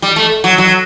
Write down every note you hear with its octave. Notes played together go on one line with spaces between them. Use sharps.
G3
A3
F#3
F#3